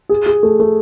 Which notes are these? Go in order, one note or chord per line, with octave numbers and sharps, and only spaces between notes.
G#4
G#4
A3
A3